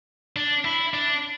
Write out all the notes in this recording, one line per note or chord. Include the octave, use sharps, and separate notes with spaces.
D4
E4
D4